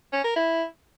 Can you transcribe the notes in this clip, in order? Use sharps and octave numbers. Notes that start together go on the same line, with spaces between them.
C#4
A#4
E4